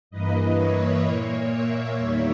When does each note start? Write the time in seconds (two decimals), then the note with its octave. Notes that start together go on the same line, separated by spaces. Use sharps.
0.11 G2 E3 A#3 B4 D#5
0.57 C#5 E5
1.03 A#2 A#3 C#5
1.49 C#5 E5
1.96 E2 D#3 G3 A#3